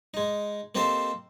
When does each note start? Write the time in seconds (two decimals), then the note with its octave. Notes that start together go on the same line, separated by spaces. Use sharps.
0.14 G#3 D#4
0.75 A#3 C4 D#4 G4 A4 C5